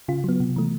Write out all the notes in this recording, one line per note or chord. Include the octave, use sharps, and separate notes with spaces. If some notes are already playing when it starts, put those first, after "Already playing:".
C#3 F4
F#3 B3
C3
E3 A3